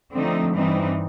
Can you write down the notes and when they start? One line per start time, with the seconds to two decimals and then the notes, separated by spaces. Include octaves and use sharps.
0.13 D3 F3 A3 C4 D#4
0.54 G2 E3 G3 C4 D#4